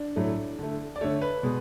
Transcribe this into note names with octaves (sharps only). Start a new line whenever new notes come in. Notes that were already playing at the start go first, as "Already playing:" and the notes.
Already playing: D4
A2 F#3 A3
D3 A3
D5
D3 A3 C#5
B4
B2 G#3